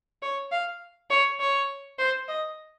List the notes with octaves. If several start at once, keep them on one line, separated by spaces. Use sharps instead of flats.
C#5
F5
C#5
C#5
C5
D#5